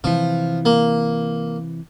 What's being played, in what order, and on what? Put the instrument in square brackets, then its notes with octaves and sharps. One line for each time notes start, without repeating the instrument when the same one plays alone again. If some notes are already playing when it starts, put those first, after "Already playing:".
[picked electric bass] C3 E3 [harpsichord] F3
[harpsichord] A#3